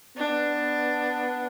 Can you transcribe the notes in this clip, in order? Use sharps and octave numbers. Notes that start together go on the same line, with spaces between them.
B3 D4